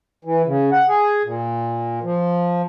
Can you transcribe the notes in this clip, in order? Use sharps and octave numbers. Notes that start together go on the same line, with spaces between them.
E3
C#3
F#5
G#4
A#2
F3